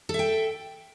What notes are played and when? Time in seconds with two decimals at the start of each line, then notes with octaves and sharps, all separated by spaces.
0.09 A4
0.14 E5
0.19 G5